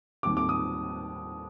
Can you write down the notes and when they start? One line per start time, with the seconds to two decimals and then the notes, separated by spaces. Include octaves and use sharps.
0.23 D#2 D#3 G3 C4 D6
0.37 D6
0.49 D#6